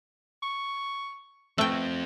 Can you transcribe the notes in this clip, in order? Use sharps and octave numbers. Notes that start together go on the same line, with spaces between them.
C#6
F3 A3 B3 C4 G5